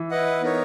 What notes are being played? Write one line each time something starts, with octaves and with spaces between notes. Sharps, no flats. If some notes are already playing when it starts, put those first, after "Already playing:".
Already playing: E3
E4 B4 D#5 F#5
B3 D#4 A#4 C#5